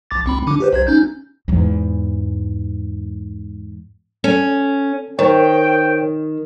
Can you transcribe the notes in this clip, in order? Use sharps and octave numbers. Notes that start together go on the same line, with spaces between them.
A#1 D6 A6
C#2 C4 B5
D3 D4 D6
G4 B4 C5
B1 C5 G#6
C#4 D#4 G6
E2 G#2
C#4 A4
D#3 A#4 C5 C#5 G5